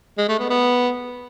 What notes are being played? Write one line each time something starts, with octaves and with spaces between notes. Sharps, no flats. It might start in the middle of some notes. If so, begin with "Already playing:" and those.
G#3
A3
B3
B3